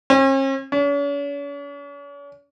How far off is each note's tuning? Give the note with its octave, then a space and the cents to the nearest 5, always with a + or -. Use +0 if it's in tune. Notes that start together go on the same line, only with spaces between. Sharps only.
C#4 -45
C#4 +45